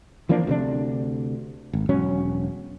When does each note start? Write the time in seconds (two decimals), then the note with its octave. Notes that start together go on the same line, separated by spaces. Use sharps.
0.29 E3 F3 A#3 D4
0.47 D2 C3 D4
1.73 G#1
1.89 E1 F#3 C#4